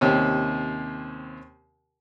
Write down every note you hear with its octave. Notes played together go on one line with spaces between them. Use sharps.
D#2 C3 C#4